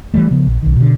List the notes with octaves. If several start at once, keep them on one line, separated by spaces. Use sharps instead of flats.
E3 F#3 G3 A3
C#3 F3 B3
A#1
B1 D#3
B2 D3